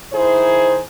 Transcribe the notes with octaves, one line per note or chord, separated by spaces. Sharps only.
D#3 E4 G#4 C5